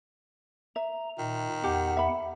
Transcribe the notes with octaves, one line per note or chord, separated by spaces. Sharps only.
E5 A#5
A#2 D#3
E2 G4 F#5
E5 B5